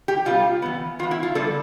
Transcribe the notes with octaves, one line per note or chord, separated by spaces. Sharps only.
G4
C3 G3 B3 F4
E3 B3
E3 B3 F4
E4
F4
D3 G3 B3 A4